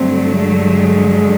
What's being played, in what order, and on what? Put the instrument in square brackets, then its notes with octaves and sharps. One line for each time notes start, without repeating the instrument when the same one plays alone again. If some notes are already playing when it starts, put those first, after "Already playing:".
Already playing: [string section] G2 D3 F#3 A3 [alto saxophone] C4
[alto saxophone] G#3